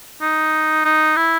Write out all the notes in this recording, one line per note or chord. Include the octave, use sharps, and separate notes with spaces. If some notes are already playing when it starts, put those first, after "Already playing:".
D#4
D#4
E4